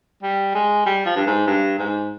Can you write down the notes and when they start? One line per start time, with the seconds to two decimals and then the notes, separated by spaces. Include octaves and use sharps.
0.23 G3
0.55 G#3
0.86 G3
1.06 F3
1.16 G2
1.27 G#2
1.47 G2
1.78 G#2